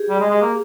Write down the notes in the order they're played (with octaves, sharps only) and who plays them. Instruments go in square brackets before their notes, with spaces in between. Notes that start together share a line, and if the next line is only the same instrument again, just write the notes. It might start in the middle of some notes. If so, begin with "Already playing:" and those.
Already playing: [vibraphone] G4 G#4
[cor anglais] G3
G#3
G#3
A#3